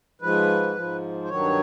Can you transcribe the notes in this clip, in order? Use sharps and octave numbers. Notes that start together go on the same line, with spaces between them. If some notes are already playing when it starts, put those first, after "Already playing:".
G#2 F3 B4
G#2 F3
C5
G2 D#3 F#3 C#5